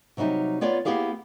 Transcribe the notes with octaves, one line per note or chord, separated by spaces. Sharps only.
C3 F#3 G3 D#4 E5
B3 F4 C#5 D5
A#3 B3 E4 G4 G#4 F5